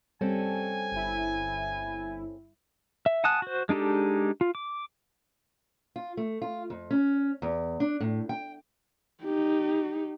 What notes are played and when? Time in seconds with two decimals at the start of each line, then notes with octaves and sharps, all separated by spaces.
0.21 G3 C4 C#4 A4 G#5
0.92 G1 E4
3.06 E5
3.24 F#5 G#5 A5 D#6 F#6
3.42 F#4 C5
3.69 G#3 D4 D#4 G4 A4
4.41 F4
4.55 D6
5.96 F4
6.17 A3
6.42 F4
6.70 F2
6.91 C#4
7.42 E2
7.80 D4
8.00 A2
8.29 G5
9.23 D#4 G4